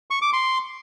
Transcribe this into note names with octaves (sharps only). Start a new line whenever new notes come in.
C#6
D6
C6